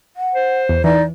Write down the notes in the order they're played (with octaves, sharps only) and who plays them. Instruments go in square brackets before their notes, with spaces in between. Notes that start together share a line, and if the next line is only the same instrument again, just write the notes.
[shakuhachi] F#5
[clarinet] C5
[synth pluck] E2
[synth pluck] E3 [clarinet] D#4 [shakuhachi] D5